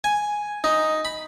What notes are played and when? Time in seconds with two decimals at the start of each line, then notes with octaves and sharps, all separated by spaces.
0.04 G#5
0.64 D#4
1.05 B5